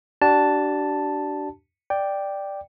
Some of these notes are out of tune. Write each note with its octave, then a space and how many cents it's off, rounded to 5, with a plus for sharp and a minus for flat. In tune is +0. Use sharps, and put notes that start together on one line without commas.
D4 +0 G4 -45 A5 +0
D5 +5 G5 +0